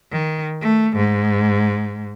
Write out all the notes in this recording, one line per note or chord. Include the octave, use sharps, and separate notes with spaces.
D#3
A3
G#2